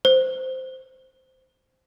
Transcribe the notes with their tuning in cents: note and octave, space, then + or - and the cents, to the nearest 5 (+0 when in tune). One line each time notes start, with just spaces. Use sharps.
C5 -10